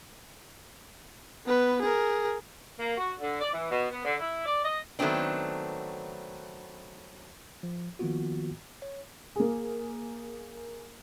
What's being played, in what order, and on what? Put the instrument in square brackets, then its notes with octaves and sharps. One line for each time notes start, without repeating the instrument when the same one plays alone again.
[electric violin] B3 B4
G#4 A#4
[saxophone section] A#3
F#4
D3
D5
E3
B2
B3
D3
E4
D5
D#5
[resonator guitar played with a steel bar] D#3 F#3 A3 B3 C4 D4
[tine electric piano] F3
D#3 F3 A#3 B3 F4 F#4
C#5
[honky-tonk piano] A#3 G#4